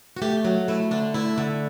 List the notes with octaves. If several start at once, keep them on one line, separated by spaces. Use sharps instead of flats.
F#4
A3 G4
F#3
A3 E4
D3 D4
A3 E4
D3